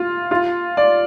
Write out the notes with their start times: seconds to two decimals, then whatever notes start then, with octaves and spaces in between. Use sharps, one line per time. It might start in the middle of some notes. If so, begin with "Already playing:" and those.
Already playing: F4
0.31 F4
0.77 D5